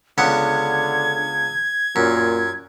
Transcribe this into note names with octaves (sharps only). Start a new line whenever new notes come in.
C#2 D3 B3 F#5 G#6
F#2 A#2